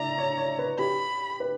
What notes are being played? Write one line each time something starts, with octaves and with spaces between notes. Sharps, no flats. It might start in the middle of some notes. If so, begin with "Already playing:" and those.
Already playing: D5 E5 A#5
C#5
C#5
B4
G4 B5
B4